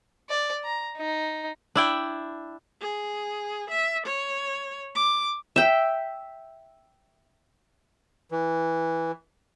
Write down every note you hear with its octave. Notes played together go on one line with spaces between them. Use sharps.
D5
A#5
D#4
D4 E4 G5
G#4
E5
C#5
D6
E5 G5
E3